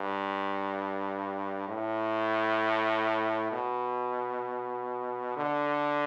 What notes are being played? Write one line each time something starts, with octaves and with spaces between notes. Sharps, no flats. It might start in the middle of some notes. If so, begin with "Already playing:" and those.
Already playing: G2
A2
B2
D3